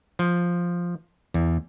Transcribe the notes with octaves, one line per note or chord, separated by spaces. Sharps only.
F3
E2